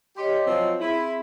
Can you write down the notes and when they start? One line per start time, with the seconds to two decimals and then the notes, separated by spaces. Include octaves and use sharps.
0.17 G4 C#5 D#5 C6
0.44 F3 F#3 C4
0.80 C4 E4 G#4